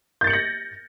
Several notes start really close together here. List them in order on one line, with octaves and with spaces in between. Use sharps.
G6 A6 C#7 F#7 A#6